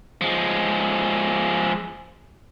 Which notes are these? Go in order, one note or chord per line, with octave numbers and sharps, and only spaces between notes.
F3 G#3